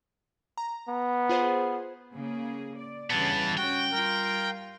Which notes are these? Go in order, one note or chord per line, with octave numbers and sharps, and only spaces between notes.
A#5
B3
F4 G#4 C5
C#3 A#3 G#4
D5
G2 C#3 E3 B3 A5
G3 C#4 F#4 G5
G3 F4 A#4